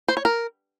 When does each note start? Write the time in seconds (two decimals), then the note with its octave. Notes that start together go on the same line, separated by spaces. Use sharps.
0.08 C5
0.17 C#5
0.25 A#4